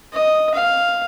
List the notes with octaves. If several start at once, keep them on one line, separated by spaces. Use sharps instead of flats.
D#5
F5